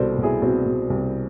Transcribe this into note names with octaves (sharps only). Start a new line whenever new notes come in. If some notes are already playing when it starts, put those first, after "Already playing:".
Already playing: C2 B2 A4 C5 D5
B2
E4 G#4
B2 C4
B2
C2